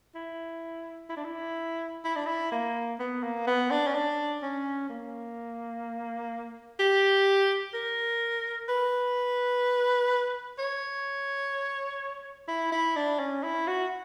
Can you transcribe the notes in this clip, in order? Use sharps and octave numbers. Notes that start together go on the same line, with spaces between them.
E4
E4
D4
E4
E4
D4
E4
A#3
B3
A#3
B3
D4
C#4
D4
C#4
A#3
G4
A#4
B4
C#5
E4
E4
D4
C#4
E4
F#4